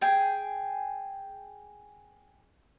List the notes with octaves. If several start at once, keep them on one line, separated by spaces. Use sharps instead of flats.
G#4 G5